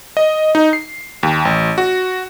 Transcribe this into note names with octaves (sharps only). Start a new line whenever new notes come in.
D#5
D#4
C7
D#2
A1
F#4